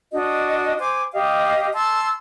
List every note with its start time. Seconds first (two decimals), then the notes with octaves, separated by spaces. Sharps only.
0.12 D4 F#4 D#5
0.78 C5 G#5 D6
1.12 G4 D#5 F5
1.73 A5 C6 E6